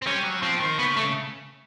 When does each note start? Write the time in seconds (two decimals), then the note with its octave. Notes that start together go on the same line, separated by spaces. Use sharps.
0.02 C4
0.06 G3 C#4
0.24 F#3
0.42 F3 C4
0.60 D#3
0.78 C#3 B3
0.96 A3